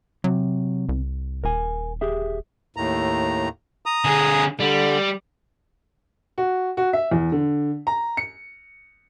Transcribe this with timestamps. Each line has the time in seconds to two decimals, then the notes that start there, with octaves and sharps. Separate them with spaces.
0.24 C3 F#3
0.89 C2
1.44 D#1 A#4 G#5
2.01 G4 G#4 E5
2.76 D#2 A2 A#5
3.86 A#5 D#6
4.05 D3 G#4
4.60 D3 G3
6.38 F#4
6.77 F#4
6.93 E5
7.11 E2
7.32 D3
7.87 A#5
8.17 C#7